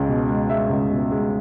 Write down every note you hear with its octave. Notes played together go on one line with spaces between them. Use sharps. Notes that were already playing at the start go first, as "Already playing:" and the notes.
Already playing: C#2 G#3
B2
G#3
G#3 E5
C#2
B2
G#3